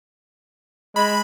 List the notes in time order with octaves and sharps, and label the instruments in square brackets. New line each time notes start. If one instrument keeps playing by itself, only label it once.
[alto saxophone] G#3 [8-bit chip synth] B5